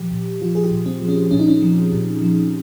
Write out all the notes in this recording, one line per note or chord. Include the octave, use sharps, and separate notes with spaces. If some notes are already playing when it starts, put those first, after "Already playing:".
Already playing: A#2 F3 G4
A#2
F3 F4
G#4
G4
A#2
C4
F3
C#4
A#2 C#4
D#4
C#4
F3
A#2
F3